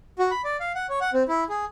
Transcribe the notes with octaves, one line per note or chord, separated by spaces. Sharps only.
F#4
B5
D5
F5
F#5
C#5
F#5
C4
E4
G#4